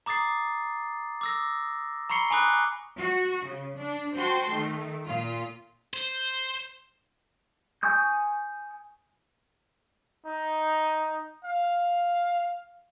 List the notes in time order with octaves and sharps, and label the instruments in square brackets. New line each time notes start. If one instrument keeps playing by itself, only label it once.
[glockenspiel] A#5 D6 D#6 A6 C7
D6 E6 A#6
A#5 B5 C#6 C7 C#7 G7
G#5 A#5 B5 D6 D#6 F#6
[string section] F#4
C#3
D4
F#4 C5 G5 A5 C6
D#3 A3
A#2 F4
[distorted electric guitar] C5
[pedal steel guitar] G#5 C#6 D#6 G6
[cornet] D#4
F5